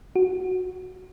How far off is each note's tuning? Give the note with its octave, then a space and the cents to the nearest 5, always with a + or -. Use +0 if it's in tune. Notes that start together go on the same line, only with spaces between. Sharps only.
F#4 -5